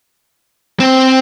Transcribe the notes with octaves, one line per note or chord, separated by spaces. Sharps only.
C4